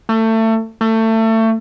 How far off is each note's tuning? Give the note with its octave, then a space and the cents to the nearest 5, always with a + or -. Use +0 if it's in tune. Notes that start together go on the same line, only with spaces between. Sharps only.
A3 +25
A3 +25